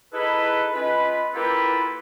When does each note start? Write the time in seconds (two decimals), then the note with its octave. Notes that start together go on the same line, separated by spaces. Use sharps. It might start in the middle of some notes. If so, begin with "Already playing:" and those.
0.13 D#4 E4 G#4 A4 B4
0.74 G#3 C#4 F4 B4
1.34 A#3 E4 F4 G4 A4 B4